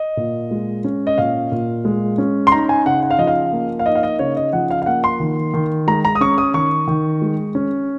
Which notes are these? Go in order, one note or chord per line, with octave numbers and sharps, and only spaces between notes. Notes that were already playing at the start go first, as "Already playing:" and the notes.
Already playing: D#5
A#2
G#3
C#4
D#5
A#2 F5
A#2
G#3
C#4
C6
D#4 A#5
G#5
C#3 F#5
F#5
F5
F3 D#5
F5
A#3
F5
D#4 D#5
F5
D#5
C#3 C#5
D#5
F3 F#5
F5
F5
A#3 F#5
C6
D#3
D#3
G#3 A#5
A#5
D#6
C#4 C#6
D#6
D#3 C#6
D#3
G#3
C#4